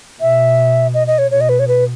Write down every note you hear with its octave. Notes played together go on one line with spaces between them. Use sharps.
B2 E5
D#5
D#5
C#5
B2 C#5
D#5
B4
C#5
B4